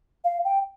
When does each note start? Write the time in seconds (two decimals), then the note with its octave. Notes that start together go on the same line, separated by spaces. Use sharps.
0.24 F5
0.45 G5